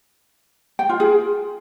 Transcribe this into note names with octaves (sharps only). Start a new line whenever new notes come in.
G5
F4
G#4